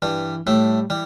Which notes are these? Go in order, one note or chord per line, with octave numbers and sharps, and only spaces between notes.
G2 E3 G3
A2 G3 A3
E3 G3